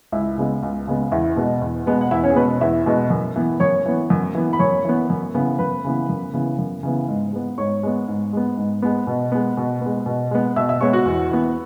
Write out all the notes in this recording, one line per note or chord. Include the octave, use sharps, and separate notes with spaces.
C#2 E4 E5
C#3 G#3 B3
C#2
C#3 G#3 B3
E2 E4 E5
B2 G#3 B3
E2
B2 G#3 B3
F#5
E2 E4 E5
C#4 C#5
G#4
B2 G#3 B3 B4
E2 E4 E5
B2 G#3 B3
F#2
E3 B3
F#2 C#5 C#6
E3 B3
F#2
E3 B3
B5
F#2 C#5 C#6
E3 B3
F#2
C#3 E3 B3
F#2 B4 B5
C#3 E3 B3
F#2
C#3 E3 B3
F#2
C#3 E3 B3
G#2
G#3 B3
G#2 C#5 C#6
G#3 B3
G#2
G#3 B3
G#2
G#3 B3
B2
G#3 B3
B2
G#3 B3
B2
G#3 B3
B2 E5 E6
E5 E6
G#3 B3 C#5 C#6
F#4 F#5
E2
E3 B3